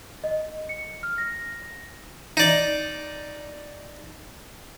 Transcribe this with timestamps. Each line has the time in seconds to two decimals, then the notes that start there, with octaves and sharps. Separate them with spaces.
0.24 D#5
0.69 C#7
1.03 F6
1.18 A#6
2.37 D#4 D5